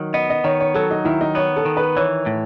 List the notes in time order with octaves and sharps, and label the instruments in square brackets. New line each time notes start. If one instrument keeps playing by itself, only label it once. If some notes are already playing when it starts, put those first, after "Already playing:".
Already playing: [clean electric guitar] D#3 F#3
[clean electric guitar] B3 [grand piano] D#5
[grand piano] D#5
[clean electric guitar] D#3 [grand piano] C#5
[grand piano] C#5
[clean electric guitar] F#3 [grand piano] A4
[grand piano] D#4
[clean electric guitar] D#3 [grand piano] E4
[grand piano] D#4
[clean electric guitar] B3 [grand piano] C#5
[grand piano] A4
[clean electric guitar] D#3
[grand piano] B4
[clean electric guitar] E3 [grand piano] C#5
[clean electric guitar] A2